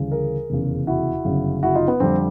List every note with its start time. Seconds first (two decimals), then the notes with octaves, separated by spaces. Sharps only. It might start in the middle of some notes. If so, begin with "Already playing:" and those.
Already playing: D2 C#3 E3 G3
0.12 G#4 A#4
0.50 F1 E2 C#3
0.87 E4 F#4
1.25 G1 F#2 C#3
1.63 E4 F#4
1.75 D#4 F4
1.88 B3
2.00 F2 D3 G3 C4